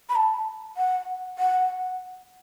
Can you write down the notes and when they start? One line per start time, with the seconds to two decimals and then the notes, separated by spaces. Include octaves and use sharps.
0.09 B5
0.16 A5
0.77 F#5
1.38 F#5